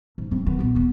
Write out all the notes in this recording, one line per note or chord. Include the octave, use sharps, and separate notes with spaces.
G#2
F3 C4
D#3 B3
A#2 B3
D#1 B3